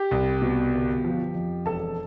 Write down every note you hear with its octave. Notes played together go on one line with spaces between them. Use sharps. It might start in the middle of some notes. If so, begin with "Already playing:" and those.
Already playing: G4 G5
C2
B2
G1
F3
F2
E1 A4 A5